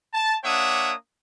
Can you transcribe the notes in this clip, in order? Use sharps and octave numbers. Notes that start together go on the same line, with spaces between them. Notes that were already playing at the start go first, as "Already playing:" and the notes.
A5
A#3 D4 C#5 E5 F#5 D#6